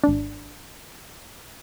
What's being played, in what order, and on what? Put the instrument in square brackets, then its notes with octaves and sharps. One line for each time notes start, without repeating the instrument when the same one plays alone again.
[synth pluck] G#1 D4